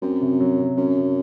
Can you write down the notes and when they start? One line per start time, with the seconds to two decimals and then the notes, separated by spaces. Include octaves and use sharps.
0.02 F#2 C4
0.21 C3
0.40 F#3
0.59 C3
0.77 F#2 C#4
0.96 C3